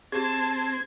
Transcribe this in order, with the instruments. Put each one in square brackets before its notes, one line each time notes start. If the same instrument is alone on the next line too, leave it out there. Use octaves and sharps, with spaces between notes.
[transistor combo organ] C4 [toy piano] G4 G#4 [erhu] A5 [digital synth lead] G#6